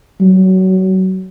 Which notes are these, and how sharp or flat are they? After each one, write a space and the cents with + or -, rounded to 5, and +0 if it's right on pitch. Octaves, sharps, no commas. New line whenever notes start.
F#3 +20